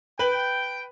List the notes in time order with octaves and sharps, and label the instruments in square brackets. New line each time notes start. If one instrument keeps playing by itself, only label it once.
[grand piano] B4 F#7 [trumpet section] G5